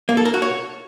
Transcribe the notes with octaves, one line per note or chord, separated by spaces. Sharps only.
A#3
A4
A#4
F#4
C#5